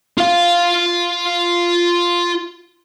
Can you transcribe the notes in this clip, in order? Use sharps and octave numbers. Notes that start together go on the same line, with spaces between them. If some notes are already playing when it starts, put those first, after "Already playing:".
F4 F5